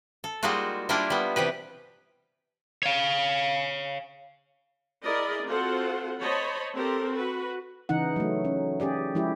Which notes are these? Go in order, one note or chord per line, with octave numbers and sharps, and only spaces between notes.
A4
G3 G#3 A#3 D#4 F4 F#4
G3 A#3 D4 E4 F4 A#4
G3 B3
C3 E3 G4 B4
C#5 F5
E4 G#4 A#4 D5 D#5
C4 F4 F#4 A4 C5 F#5
C5 C#5 D#5 A5 B5
C4 G4 A4 A#4 C5
F#4 B4
C#3 E3 D#4 F#5
F#3 A3
C#4
C#4 G4 G#4 D5
F3 G#3 E4 G4